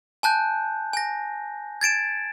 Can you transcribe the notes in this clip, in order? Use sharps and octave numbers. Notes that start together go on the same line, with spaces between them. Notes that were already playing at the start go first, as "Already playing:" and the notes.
G#5 A5 F#6 G6
G#5 A#6
G#6 A6 D7 E7